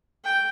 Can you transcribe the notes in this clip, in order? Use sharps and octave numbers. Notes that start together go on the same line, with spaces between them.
G5